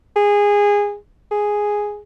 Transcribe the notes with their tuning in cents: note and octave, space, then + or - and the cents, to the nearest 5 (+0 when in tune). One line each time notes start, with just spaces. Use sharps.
G#4 -20
G#4 +0